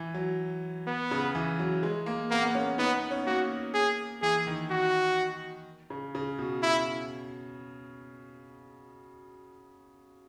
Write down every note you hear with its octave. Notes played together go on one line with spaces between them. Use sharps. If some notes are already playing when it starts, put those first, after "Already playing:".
Already playing: E3
F#3
B3
C#3
E3
F#3
G#3
A#3
A#3 B3
B3
C#4
B3 D#4
B3
C#4
A#3 F#4
G#4
E3 G#4
D#3
F#4
C#3
C#3
B2
E4